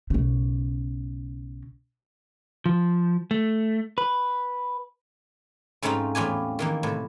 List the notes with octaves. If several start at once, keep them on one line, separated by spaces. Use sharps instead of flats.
B1 C#3
F3
A3
B4
G#2 C#3 A3 C4 D#4 F4
E2 A2 F4 G4 G#5
D#3 E3 A#3
A2 C3